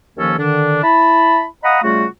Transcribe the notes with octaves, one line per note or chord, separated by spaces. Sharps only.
D#2 D#3 F3 A#3 C#4 A4
D3 D#3 D4
E4 A5 B5
D#5 F5 F#5 A#5 B5 D#6
C#3 G3 A3 F4 F#4